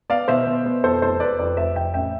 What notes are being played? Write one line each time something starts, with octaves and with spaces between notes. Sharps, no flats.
B3 D5 F5
B2 C5 E5
B2
B3
F2 A4 C5
F1 A4 C5
F1 B4 D5
F2 B4 D5
F1 C5 E5
F1 E5 G5
A1 E5 G5